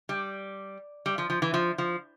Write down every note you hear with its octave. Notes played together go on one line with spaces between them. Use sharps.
G3
G3
F3
F3
E3
F3
F3